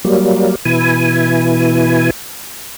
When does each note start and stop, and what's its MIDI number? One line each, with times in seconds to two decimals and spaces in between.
0.05 0.55 54
0.05 0.55 55
0.05 0.55 58
0.65 2.10 47
0.65 2.10 52
0.65 2.10 64
0.65 2.10 80